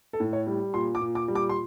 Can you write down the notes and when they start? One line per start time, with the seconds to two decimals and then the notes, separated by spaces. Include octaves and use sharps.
0.13 A4
0.20 A2
0.33 C#5
0.47 G3
0.74 A#2 C6
0.95 D6
1.01 A#2
1.15 D6
1.28 G3
1.35 D6
1.49 C6